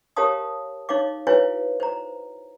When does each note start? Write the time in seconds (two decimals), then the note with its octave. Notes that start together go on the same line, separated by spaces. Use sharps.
0.16 G4 A#4 C#5 F5 A5 D#6
0.89 D#4 C#5 F5 D6
1.27 E4 F#4 B4 C#5 F5 G#5
1.80 C5 A#5